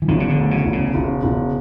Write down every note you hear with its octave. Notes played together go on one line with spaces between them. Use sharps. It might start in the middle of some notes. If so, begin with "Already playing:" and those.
E3
E1 D#3
C#3
D3
D2
C#3
E1
C#3
E1
E1